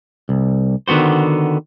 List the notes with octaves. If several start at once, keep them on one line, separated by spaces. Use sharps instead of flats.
C2
D3 D#3 B3 F#4 C5